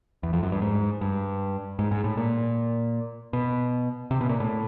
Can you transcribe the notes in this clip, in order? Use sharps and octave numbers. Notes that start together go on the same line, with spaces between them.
E2
F2
F#2
G2
G#2
G2
G#2
G#2
A2
A#2
B2
C3
B2
A#2
A2